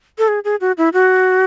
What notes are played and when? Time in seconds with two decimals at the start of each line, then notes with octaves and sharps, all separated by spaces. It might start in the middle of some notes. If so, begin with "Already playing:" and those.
0.18 A4
0.28 G#4
0.44 G#4
0.61 F#4
0.78 E4
0.93 F#4